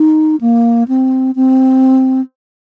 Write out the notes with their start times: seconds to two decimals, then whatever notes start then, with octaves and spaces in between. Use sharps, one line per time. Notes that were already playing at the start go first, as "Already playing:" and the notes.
Already playing: D#4
0.41 A#3
0.88 C4
1.36 C4